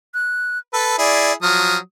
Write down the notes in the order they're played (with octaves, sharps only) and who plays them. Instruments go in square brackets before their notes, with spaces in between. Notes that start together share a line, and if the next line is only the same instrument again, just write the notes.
[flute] F#6
[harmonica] A4 B4 [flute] E6
[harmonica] E4 G#4 [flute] D5
[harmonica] F3 F#3 D#6 [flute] F6